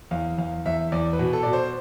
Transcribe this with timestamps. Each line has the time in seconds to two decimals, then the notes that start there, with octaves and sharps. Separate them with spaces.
0.11 E2 F5
0.38 E2 F5
0.66 E2 E5
0.92 E2 D5
1.13 B4
1.19 B2
1.33 A4
1.43 B2 D5
1.53 C5